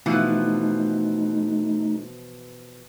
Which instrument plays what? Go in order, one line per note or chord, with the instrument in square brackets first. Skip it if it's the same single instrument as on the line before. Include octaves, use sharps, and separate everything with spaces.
[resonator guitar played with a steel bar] B2 E3 F3 [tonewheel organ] A3 D#4